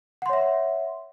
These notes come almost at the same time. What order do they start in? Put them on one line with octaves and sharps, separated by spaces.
F#5 C6 C#5 E5